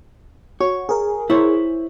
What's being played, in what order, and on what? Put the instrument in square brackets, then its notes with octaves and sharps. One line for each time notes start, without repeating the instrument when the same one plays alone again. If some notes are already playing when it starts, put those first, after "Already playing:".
[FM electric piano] F#4 [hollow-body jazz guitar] C#5
[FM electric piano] G#4 A#4
[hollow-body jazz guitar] E4 C5 C#5